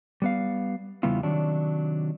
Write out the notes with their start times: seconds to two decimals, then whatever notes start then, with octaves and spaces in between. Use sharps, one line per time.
0.22 G3 B3 F5
1.03 E2 C#3 G3 B3 E4 F4
1.23 C3 D#3 F#3 D4